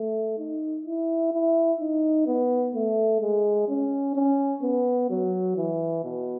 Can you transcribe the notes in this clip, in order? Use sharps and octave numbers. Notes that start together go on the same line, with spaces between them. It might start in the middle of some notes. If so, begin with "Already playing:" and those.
Already playing: A3
D#4
E4
E4
D#4
B3
A3
G#3
C#4
C#4
B3
F#3
E3
B2